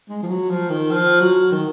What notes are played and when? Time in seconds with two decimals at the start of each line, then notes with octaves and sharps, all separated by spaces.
0.09 G#3
0.22 F3
0.28 F#3
0.50 F3
0.69 D#3
0.90 F3
1.20 F#3
1.51 D#3